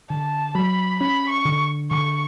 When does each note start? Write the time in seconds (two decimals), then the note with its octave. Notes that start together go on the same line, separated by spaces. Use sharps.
0.10 D3 A5
0.55 F#3 B5
1.00 C#4 B5
1.30 C#6
1.45 D3
1.90 D3 C#6